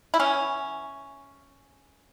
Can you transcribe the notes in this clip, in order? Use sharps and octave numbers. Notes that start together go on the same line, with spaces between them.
E4
E3 B3 C#4